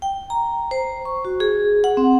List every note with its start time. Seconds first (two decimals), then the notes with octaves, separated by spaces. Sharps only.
0.02 G5
0.30 A#5
0.71 C5
1.05 C#6
1.25 F#4
1.40 G#4
1.84 F#5
1.97 C4